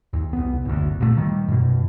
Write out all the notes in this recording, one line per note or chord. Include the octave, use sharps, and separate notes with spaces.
D#2
C2 B3
F#1 D2
A#2 F3 A3
D#3 G3
F#2 B2